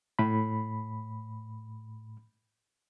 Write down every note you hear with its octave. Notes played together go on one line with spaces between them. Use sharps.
A2 B5